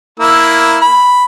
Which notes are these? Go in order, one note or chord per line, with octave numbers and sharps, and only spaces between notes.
A#3 E4 E6
B5